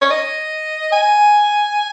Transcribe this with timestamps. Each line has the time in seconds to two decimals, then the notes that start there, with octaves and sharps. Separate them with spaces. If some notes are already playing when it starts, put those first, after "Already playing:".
0.01 C#5
0.11 D#5
0.92 G#5